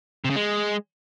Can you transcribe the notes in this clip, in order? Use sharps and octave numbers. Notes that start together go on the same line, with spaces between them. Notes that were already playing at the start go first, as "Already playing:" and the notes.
C3
C#3
G#3